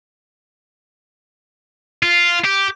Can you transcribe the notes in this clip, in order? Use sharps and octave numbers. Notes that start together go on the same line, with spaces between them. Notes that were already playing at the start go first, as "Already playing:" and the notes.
F4
G4